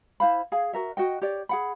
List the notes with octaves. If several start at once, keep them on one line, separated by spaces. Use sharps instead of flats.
E4 C5 F5 B5
G#4 F5 G#5
F#4 A#4 E5
F#4 D#5 G5
G4 C#5 D5
G#4 F#5 B5